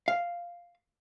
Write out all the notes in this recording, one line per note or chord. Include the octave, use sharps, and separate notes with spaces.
F5